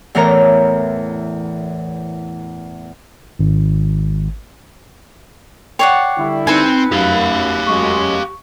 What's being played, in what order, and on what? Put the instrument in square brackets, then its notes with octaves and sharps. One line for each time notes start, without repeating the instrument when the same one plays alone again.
[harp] E2 A2 E3 A#4 C#5 A#5
[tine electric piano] G#1
[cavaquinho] C#5 D5 F#5 [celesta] G5 C#6 C7
[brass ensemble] D3 G3 E4
[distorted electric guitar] C4 [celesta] D#4 F#6 C#7 [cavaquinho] B4 G#5
[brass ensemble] F#2 [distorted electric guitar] G4 F5
[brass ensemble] F#2 F#3 G#3 [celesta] C#6